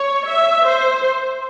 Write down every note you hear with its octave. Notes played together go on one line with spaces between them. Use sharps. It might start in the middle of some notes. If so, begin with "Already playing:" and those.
Already playing: C#5
E5
C5